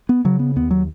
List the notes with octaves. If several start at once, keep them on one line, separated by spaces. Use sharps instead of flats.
B3
C#3 F#3
B3
D#2 B3
F#3